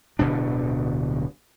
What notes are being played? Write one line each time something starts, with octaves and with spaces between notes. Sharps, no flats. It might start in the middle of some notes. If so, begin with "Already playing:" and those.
D1 B2 D3 D4